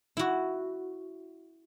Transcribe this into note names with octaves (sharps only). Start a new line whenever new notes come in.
E4 F#4